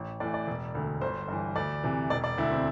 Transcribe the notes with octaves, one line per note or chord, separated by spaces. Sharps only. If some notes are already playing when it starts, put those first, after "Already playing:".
Already playing: A1
A2 E3 D5
D5
E1
D2 D3
G1 C5
G2 E3
D2 D5
C3 E3
E1 D5
D5
D2 D3 E4
C4